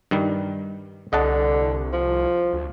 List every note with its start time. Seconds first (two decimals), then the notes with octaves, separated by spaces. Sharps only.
0.11 G2 D#3 G3
1.13 C2 D3 D#5 F#5 A5
1.93 F3
2.53 D2